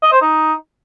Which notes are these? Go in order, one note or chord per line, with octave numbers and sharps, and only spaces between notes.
D#5
C5
D#4